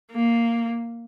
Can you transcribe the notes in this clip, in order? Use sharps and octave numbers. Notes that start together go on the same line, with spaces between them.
A#3